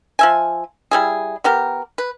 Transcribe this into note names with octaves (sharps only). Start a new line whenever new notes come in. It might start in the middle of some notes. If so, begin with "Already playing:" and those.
F3 E5 G#5
G3 E4 G#4
B3 G4 A#4
B4